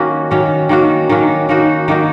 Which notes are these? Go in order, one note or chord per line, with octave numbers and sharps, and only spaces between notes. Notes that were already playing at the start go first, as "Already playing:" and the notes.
Already playing: D#3 A#3 C#4 F#4
D#3 A#3 C#4 F#4
D#3 A#3 C#4 F#4
D#3 A#3 C#4 F#4
D#3 A#3 D#4 F#4
D#3 A#3 D#4 F#4